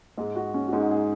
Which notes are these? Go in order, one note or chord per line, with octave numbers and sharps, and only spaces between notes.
G#2 G#3 G#4
F#4
C#4
F#4
G#2 G#3 D#4
G#4